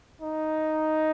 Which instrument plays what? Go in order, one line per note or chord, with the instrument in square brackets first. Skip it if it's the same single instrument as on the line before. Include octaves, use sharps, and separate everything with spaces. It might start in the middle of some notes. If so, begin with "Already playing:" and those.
[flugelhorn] D#4